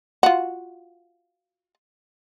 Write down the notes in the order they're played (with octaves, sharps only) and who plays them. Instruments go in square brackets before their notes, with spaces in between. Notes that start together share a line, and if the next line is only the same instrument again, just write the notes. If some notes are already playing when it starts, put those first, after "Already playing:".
[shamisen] F4 F#4